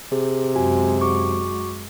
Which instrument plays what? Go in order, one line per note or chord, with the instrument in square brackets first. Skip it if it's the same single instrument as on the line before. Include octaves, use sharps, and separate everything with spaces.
[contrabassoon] C3 [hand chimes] G#4
[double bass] F#2 G#3 [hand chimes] F#4 G#5
[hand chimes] F#4 C#6 D6